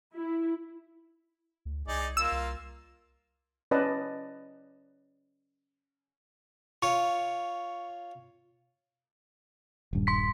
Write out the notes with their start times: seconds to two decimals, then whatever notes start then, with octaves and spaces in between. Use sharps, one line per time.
0.15 E4
1.65 D2
1.88 C2 D#4 G#4 D5
2.17 A#3 F4 E6
2.32 C2
3.71 C#4 B4 D5 D#5 A5
6.82 F4 C#5 C#6
9.93 D#1 G2
10.07 C6 B6